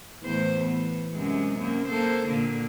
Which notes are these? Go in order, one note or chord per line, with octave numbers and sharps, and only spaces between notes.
E2 A2 C5
B3
F#2 C3 G#3
F#2 A#3
A#3 A4 C5
A#2 D3 A#3